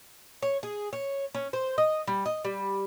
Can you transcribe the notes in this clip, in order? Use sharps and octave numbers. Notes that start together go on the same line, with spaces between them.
C#5
G#4
C#5
C#4
C5
D#5
G3
D#5
G3